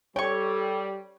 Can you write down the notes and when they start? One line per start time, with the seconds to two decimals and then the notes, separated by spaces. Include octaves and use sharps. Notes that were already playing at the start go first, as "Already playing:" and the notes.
0.16 G3 A4 C#5 G5 C#6